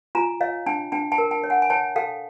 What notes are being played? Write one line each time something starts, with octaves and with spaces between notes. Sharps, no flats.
F4 G#5 A#5
C#5 D#5 F5
D4 G5 A5
D4 G5 A5
G5 A5
A#4
G5 A5
C#5
F#5 G#5
G#5
C#5 G5 A5
A4 F5 G5